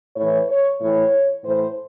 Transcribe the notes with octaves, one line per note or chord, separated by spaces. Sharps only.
A2 E3 C#5
C#5
A2 E3 C#5
A2 E3 C5